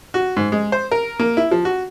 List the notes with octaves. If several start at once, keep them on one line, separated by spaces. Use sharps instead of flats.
F#4
G#2
G#3
C5
A#4
A#3
E4
F3
F#4